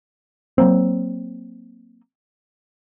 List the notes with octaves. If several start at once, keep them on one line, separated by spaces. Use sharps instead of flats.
F#3 A#3 C4